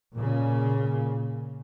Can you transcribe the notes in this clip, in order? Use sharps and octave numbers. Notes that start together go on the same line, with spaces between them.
A#2 C#3